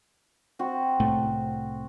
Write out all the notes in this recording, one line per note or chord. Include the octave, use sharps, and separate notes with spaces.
C4 F#4
C2 A2 A3